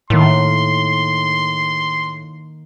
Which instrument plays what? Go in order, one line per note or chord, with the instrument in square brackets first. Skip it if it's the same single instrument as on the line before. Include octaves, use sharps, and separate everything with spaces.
[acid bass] A2 [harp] D#3 A#3 F6 [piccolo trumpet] C6